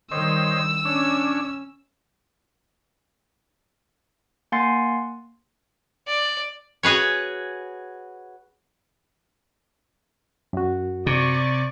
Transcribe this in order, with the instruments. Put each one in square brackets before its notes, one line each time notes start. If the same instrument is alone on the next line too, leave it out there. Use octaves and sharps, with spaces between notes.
[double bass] D#3 G3 [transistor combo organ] C5 C#5 D#5 [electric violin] E6
[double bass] C#4 [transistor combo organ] D4 C#5
[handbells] A#3 F#5 G#5 C6 A6 C7
[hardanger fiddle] D5
[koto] F#4 G#4 B4 C#5
[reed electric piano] F#2 F#4
[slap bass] C3 [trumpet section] D5 C#6